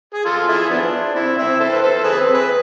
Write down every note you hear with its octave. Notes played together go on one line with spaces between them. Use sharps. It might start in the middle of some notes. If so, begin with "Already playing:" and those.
G#4
F4 A4
E4 G#4
F3 B3 D4
C4 E4
C4 E4
A4 C5
B4
A4 C5
G#4 B4
C4
G#4 B4